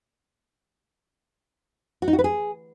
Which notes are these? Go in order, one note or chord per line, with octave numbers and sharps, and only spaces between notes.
F#4
D#4
F#4
B4
G#4